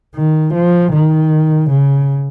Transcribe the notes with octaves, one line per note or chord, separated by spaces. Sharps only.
D#3
F3
D#3
C#3